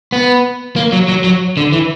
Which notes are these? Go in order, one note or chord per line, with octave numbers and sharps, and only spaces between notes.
B3
A#3
F#3
F#3
F#3
D3
E3